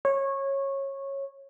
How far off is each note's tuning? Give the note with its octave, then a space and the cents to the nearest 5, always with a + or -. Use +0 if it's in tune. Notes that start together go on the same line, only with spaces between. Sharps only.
C#5 -20